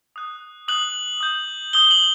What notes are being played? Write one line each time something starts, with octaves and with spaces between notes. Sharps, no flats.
D#6 F#6
D#6 F#6 F#7
D#6 G6
D#6 G6 G7
F#7